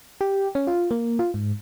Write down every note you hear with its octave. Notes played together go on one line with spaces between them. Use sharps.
G4
C#4
F4
A#3
F4
G#2